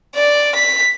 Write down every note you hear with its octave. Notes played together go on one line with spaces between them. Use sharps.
D5
B6